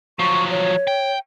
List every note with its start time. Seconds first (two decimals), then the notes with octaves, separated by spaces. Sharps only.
0.19 F3 F#3 C#6
0.50 C#5
0.87 G5